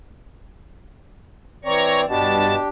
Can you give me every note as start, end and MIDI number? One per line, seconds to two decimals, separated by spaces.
1.65 2.05 52
1.65 2.09 60
1.65 2.01 73
1.65 2.05 74
1.65 2.01 82
1.65 2.01 85
2.09 2.55 43
2.09 2.58 47
2.09 2.68 62
2.09 2.68 67
2.09 2.55 81